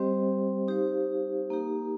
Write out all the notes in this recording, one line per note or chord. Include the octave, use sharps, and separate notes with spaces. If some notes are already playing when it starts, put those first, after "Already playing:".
Already playing: G3 C4 G4 C5 D#5
D#4 G4 C5 F5
A#3 D#4 G4 A#4